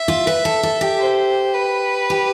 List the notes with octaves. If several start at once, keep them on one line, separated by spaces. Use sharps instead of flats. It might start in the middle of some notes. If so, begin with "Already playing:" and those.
Already playing: E5
F4
B4
A4
A4
G4
C5
B4
G4